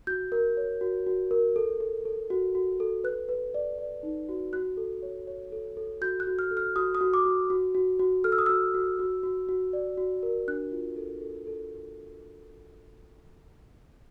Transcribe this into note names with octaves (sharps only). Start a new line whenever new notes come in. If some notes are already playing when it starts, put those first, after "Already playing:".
F#4 G6
A#4
C#5
F#4
F#4
A#4
A4
A4
A4
F#4
F#4
A4
B4 F#6
B4
D5
D5
D#4
F#4
F#4 F#6
A4
C#5
C#5
A4
A4
F#4 G6
F#6
F#4
F6
A4
F6
F#4 D#6
D#6
F#4
D6
F#4
F#4
F#4
F#4
A4 F6
E6
D#6
F#4 E6
F#4
F#4
F#4
F#4
D5
F#4
A#4
D4 F#6
F4
A4
A4
A4